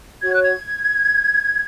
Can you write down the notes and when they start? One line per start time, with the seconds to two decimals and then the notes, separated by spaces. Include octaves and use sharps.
0.22 F#4 C#5 G#6
0.32 F#6
0.41 G#6